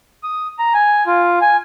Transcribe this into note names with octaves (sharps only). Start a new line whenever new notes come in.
D#6
A#5
G#5
F4
G#5